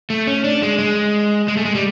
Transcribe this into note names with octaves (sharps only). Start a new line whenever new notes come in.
A3
C#4
D4
G#3
G#3
G#3
A3
G#3
G3